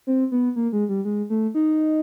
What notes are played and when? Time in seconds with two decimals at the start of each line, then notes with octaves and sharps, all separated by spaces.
0.07 C4
0.32 B3
0.56 A#3
0.73 G#3
0.89 G3
1.05 G#3
1.30 A3
1.55 D#4